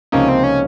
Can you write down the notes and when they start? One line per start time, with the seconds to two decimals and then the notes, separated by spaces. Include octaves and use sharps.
0.12 C#2 C3 F3 A#3 C#4 D#4
0.29 C4
0.44 C#4